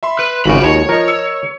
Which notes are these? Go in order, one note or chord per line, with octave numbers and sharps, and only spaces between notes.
E5 B5 C6
B4
G#1 C#3 G#3 F4 F#4 G5 B5
D#2 C#5
F3 A#4 D#5
E6